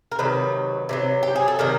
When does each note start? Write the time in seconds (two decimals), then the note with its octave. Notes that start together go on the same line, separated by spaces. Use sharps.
0.12 A#4
0.19 C3 D#3 F#3 B4
0.89 C3 D#3 F#3
1.23 G4
1.36 G#4
1.48 A4
1.59 C3 D#3 F#3 A#4